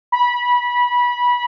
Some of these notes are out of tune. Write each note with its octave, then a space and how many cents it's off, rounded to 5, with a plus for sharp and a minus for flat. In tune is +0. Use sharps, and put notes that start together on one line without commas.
B5 -25